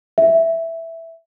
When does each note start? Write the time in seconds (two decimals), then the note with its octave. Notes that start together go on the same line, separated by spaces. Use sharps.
0.18 E5